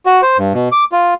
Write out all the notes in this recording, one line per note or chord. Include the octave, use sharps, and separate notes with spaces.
F#4
C5
G2
B2
D6
F4